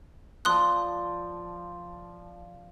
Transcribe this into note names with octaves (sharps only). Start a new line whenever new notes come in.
F3 D5 A5 C6 D#6 F#6